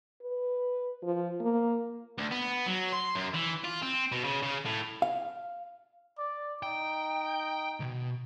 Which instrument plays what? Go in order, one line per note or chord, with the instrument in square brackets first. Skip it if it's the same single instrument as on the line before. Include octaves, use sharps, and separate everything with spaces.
[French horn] B4
F3
A#3
[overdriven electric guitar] D2
B3
F#3
C6
F#2
E3
F4
C4
B2
C#3
C#3
A2
[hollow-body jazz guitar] F5
[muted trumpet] D5
[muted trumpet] D#4 [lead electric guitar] G5
[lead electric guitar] C#2 B2